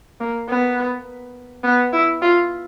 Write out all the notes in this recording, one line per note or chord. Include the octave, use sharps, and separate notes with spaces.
A#3
B3
B3
E4
F4